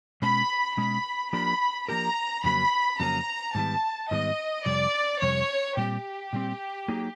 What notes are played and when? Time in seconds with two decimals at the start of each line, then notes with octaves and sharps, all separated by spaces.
0.22 B2 G#3 C#4 B5
0.77 B2 G#3 C#4 B5
1.33 F3 A#3 D4 G4 A#4 B5
1.88 F3 A#3 D4 G4 A#4 A#5
2.44 F2 C#3 F#3 A#3 C#4 B5
3.00 F2 C#3 F#3 A#3 C#4 A#5
3.55 G#2 D#3 G3 B3 A5
4.11 G#2 D#3 G3 B3 D#5
4.66 F2 C3 G3 D5
5.22 F2 C3 G3 C#5
5.77 A#2 G3 C4 G4
6.33 A#2 G3 C4
6.88 F#3 A#3 D#4 G#4